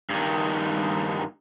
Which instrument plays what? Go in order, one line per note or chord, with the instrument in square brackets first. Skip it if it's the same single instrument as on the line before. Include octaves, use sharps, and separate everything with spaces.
[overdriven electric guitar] G2 D#3